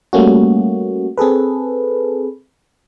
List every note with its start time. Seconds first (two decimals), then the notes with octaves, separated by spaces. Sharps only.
0.13 G3 A3 A#3 C#4 F#4
1.17 C4 G#4 A4 B4